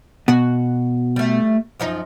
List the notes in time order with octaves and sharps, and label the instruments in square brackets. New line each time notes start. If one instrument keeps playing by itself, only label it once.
[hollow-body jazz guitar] B2 [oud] F#4
[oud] G3 A3
F#2 F3 D#4